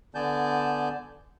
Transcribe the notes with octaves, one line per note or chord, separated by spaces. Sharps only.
D3 B3 D5 G#5 A5 G6